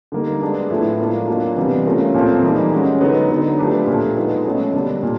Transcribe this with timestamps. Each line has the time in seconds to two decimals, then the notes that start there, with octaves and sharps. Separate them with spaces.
0.12 D3 G3 A#3 D#4
0.41 G#3 B3 D4
0.70 A2 F3 G#3 B3 E4
0.99 A#3 D4 F4
1.27 B2 F#3 A#3 D4 F4
1.56 C3 E3 G3 B3
1.86 A3 C#4 F4 A#4
2.14 A#2 F3 A3 C4 F4
2.42 E3 G3 A#3 D#4 G4
2.72 G#3 C#4 F#4
3.01 D3 F#3 B3 D#4
3.30 D3 F#3 B3 D#4
3.59 F3 A3 D4 G4 B4
3.87 A#2 F3 A3
4.16 F3 G#3 B3 D#4 G#4
4.45 B2 F#3 A3 C#4
4.73 D3 G3 A#3 D4
5.03 A#2